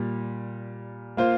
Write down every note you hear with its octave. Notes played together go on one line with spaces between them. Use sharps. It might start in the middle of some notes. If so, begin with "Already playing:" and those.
Already playing: A#2 G3
A#3 F4 C5